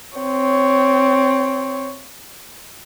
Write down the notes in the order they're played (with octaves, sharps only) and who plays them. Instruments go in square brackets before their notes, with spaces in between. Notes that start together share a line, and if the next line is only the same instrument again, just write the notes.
[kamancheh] C4 C#5